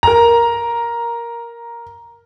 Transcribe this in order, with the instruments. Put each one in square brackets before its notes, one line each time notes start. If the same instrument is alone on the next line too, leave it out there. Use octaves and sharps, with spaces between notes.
[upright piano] A#4 A#5